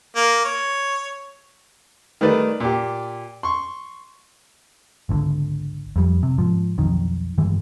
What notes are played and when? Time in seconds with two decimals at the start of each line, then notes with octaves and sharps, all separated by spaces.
0.16 A#3
0.45 C#5
2.21 D#3 G3 A3 B4 D5
2.60 A#2 G4
3.43 C6 C#6
5.09 G#1 C#2 D3
5.96 F2 G3
6.23 C3
6.38 G#2 F3
6.78 B1 F2 D#3
7.38 G2 D#3 E3 G#3